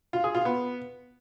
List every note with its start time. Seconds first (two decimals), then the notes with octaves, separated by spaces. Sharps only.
0.13 F4
0.24 G#4
0.35 F4
0.45 B3